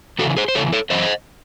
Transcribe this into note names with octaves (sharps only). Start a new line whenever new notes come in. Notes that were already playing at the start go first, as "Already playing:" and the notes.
E2 C#3 E3 F#4 A4
G#4 C5
C5
E2 C#3 E3 A4 C#5
A4 C#5
F#2 E3 C5 D#5